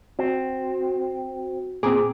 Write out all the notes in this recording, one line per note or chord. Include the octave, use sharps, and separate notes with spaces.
C4 F#4
A#2 C4 G#4 D6